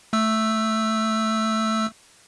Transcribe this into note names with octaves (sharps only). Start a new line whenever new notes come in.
A3 E6